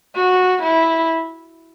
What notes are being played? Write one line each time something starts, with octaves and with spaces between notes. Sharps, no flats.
F#4
E4